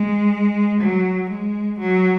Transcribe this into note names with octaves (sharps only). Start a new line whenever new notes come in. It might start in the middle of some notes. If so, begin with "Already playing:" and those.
Already playing: G#3
F#3
G#3
F#3